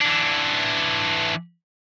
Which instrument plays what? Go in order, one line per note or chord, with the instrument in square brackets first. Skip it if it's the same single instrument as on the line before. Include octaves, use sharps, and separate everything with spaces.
[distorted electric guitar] E3 D4